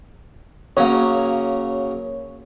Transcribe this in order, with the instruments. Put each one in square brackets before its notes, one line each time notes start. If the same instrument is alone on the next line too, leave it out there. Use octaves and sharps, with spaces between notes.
[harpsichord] C#3 F#3 A#3 [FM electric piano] C#5